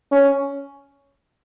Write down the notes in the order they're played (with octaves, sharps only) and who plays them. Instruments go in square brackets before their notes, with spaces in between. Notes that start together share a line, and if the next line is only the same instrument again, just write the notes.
[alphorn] C#4